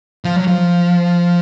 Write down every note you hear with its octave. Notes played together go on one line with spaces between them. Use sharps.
F3
F#3
F3